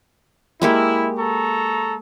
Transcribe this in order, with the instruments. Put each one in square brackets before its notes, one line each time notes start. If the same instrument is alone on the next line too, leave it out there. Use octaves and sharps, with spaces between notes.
[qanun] G#3 A#3 G4 [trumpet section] E4
[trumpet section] A4 A#5 C#6